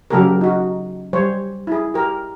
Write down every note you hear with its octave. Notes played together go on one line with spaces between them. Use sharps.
C#3 F#3 A#3 G4 A4 A#4
D#4 F#4
G3 C5 C#5
E4 G#4
G4 A#4